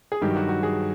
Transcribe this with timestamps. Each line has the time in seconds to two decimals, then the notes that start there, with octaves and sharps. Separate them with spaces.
0.12 G#4
0.21 G2 D#3 F#3 G4
0.36 F#4
0.49 F#4
0.63 G#4